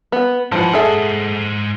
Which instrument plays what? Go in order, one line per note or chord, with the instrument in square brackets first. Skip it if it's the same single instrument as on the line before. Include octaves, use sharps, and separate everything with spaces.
[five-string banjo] B3
[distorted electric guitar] G#2 F#5 [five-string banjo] E3 F3
[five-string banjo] G#4 A4 E5